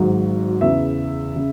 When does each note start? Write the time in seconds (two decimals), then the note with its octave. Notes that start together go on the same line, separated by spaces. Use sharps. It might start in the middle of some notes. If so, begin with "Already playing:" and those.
Already playing: G#1 G#2 F#3
0.60 E2 C#3 E3 E5
1.36 C#3